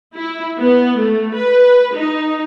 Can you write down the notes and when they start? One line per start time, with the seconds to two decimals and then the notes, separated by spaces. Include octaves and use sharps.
0.15 E4
0.59 B3
0.99 A3
1.36 B4
1.96 D#4